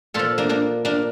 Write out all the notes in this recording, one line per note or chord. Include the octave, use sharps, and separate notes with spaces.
A#2 F3 F4 A4
A#3 D4
A#3 D4
A#3 D4